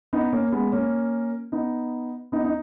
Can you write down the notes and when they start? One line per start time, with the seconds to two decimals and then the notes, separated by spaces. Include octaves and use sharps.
0.13 B3 D#4
0.32 A#3 C#4
0.52 G#3 B3
0.72 A#3 C#4
1.52 B3 D#4
2.32 B3 D#4
2.45 D#4